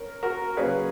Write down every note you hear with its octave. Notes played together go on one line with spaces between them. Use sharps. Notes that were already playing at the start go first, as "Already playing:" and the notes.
Already playing: C#4 A#4
F#4 A#4
C#3 F#3 A#3 C#4 G#4 B4